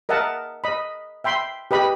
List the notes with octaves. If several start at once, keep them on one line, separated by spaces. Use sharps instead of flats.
A#4 D#5 E5 F#5 A5
D#5 B5
E5 G5 B5 C6
G4 B4 D#5 B5